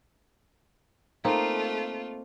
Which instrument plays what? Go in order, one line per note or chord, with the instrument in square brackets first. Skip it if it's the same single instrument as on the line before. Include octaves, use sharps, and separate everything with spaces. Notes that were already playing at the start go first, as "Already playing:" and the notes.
[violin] A3 F4 [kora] A#3 C4 D#4